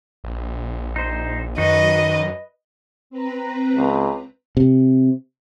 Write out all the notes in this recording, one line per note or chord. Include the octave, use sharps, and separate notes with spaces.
A#1
D#4 C5
F#2 D#3 F#4 B4 D#5
C4 B4 A#5
C#2
C3